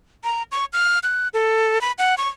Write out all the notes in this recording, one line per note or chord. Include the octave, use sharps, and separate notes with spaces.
A#5
C#6
F6
F#6
A4
B5
F#5
C#6